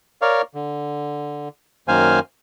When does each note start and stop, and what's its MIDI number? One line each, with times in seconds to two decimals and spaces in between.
0.22 0.42 70
0.22 0.42 73
0.22 0.42 74
0.22 0.42 77
0.55 1.49 50
1.88 2.20 42
1.88 2.20 51
1.88 2.20 58
1.88 2.20 72
1.88 2.20 77
1.88 2.20 80